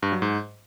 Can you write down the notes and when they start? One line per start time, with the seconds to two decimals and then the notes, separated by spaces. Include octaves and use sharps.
0.02 G2
0.12 F#3
0.22 G#2